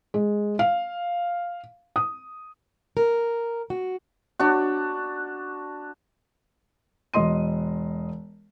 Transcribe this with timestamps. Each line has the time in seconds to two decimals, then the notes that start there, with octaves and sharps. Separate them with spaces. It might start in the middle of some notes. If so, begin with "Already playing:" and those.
0.14 G#3
0.59 F5
1.96 D#6
2.97 A#4
3.70 F#4
4.39 D4 F#4
7.14 E1 D#5 C6 D#7